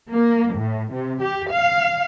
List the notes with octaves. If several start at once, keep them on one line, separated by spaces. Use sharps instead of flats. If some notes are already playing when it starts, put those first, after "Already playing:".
A#3
A2
C3
G4
F5